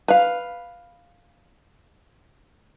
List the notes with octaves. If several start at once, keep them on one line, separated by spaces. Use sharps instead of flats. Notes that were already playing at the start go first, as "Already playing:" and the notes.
B4 F5